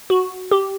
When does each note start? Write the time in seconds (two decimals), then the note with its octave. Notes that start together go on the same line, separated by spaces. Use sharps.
0.10 F#4
0.51 G4